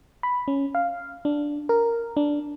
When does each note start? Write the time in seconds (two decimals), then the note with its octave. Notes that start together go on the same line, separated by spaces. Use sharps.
0.23 B5
0.48 C#4
0.75 F5
1.25 D4
1.69 A#4
2.17 D4